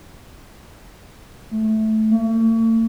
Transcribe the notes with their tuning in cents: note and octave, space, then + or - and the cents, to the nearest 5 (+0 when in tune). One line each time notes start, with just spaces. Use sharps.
A3 -10
A3 +45